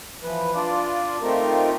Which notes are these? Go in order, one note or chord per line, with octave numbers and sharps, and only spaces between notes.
E3 F3 B4
D4 F4 D5
A3 C4 D#4 F4 G4 A#4